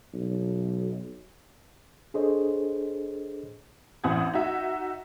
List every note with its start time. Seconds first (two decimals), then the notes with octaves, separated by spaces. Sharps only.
0.14 B1
2.14 D4 G#4 A4 C5 C#5 D#5
4.04 A1 E3 C4 F#5 D#6 G#6
4.34 D#4 F#4 E5